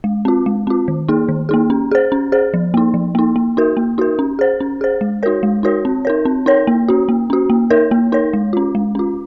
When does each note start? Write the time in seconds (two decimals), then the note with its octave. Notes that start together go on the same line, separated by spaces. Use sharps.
0.04 G#3
0.25 C4 F4
0.46 G#3
0.67 C4 F4
0.88 D#3
1.09 A#3 D#4 G#4
1.29 D#3
1.49 A#3 D#4 G#4
1.70 C#4
1.91 G#4 C5
2.12 C#4
2.32 G#4 C5
2.54 F3
2.74 A#3 D#4
2.94 F3
3.15 A#3 D#4
3.36 A#3
3.57 D#4 F#4 A#4
3.77 A#3
3.98 D#4 F#4 A#4
4.19 C#4
4.39 G#4 C5
4.61 C#4
4.81 G#4 C5
5.01 G#3
5.23 D#4 F#4 A#4 C#5
5.43 G#3
5.63 D#4 F#4 A#4 C#5
5.85 C4
6.05 D#4 A#4 C#5
6.25 C4
6.46 D#4 A#4 C#5
6.67 A#3
6.89 C#4 F#4
7.09 A#3
7.30 C#4 F#4
7.50 A#3
7.70 D#4 A#4 C#5
7.91 A#3
8.12 D#4 A#4 C#5
8.33 G#3
8.53 C#4 F4
8.75 G#3
8.95 C#4 F4